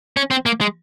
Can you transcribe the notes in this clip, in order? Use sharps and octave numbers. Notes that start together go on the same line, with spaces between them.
C#4
C4
A#3
G#3